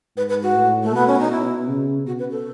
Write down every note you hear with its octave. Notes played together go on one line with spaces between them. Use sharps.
G#2 B4
B4
F#4
A2
A3
B2 B3
C#4
D#4
E4
C#3
B2 F#4
B4
A4